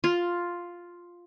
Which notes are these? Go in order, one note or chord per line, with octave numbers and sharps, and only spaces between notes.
F4